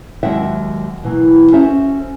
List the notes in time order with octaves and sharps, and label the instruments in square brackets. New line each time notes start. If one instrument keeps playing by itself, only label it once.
[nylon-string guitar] D#2 F#3 G#3 E5 F#5 G5
B2 E3 F#3 A#3
C#4 F#4 A4 C5 E5